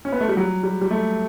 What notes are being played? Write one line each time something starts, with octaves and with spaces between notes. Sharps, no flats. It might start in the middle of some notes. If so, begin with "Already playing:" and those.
C#4
B3
A3
G3
F#3
G3
G3
A3